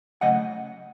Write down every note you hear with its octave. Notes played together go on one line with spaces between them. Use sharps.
C#3 F#3 A3 D#5 F#5